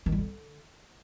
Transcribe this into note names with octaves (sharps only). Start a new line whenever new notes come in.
D#3
G3
D3